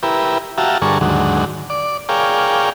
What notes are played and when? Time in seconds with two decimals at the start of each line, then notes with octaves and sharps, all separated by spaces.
0.03 E4 G4 A#4 B4
0.58 F#4 G4 E5 F5 A5 A#5
0.82 G2 D3 G#4 A#4 A5 C#6
1.01 D#2 G#2 D3 F#3
1.70 D5
2.09 G#4 A#4 C#5 D5 F5 G5